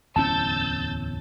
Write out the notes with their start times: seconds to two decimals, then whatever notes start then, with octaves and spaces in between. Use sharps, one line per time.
0.16 D1 E2 C#4 A5 E6 G6 A6